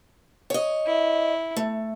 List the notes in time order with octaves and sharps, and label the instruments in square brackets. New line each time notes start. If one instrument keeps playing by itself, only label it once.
[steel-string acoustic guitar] C#5 D#5
[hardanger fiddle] E4
[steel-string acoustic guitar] A3